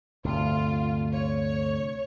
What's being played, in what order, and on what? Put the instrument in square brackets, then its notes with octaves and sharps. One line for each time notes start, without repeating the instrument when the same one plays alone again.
[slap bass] D2 G2 C3 [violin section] F4
[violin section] C#5